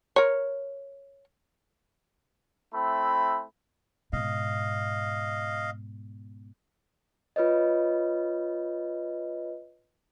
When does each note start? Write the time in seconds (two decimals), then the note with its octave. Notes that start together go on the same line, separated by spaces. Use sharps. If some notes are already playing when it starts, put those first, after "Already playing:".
0.16 A#4 C#5
2.74 A3 C4 E4 B5
4.13 G#2 B2 D#5 F5
7.36 F4 B4 C#5 D#5